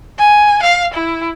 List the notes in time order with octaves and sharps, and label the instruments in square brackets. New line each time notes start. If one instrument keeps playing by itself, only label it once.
[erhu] G#5
F5
E4